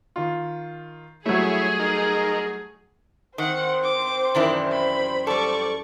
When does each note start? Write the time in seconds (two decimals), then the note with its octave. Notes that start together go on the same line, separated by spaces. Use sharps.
0.16 D#3 F4
1.26 F#3 G3 A3 E4 G#4 C#5
1.79 D#4 A#4
3.38 D#3 C4 C5 F#5
3.83 D6
4.35 F#2 C3 D#3 E3 D4 E4
4.71 B5
5.27 G3 A4 D5 C#6